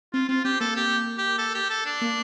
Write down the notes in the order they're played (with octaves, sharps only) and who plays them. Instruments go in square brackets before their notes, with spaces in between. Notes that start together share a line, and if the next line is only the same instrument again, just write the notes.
[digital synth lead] C4 [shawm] F4
[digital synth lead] C4 [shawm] F4
[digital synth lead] C4 [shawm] G4
[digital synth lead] A#3 [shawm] A4
[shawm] G4
G4
A4
G4
A4
D4
[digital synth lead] A#3